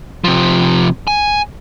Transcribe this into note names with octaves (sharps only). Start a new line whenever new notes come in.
C3 F3
G#5